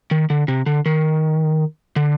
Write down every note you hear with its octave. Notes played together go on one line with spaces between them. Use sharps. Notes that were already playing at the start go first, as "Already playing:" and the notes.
D#3
D3
C3
D3
D#3
D3